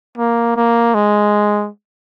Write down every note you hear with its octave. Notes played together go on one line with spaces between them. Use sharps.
A#3
A#3
G#3